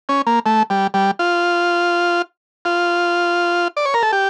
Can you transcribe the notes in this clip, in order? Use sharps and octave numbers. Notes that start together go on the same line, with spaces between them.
C#4
A#3
A3
G3
G3
F4
F4
D5
C#5
A#4
A4
G4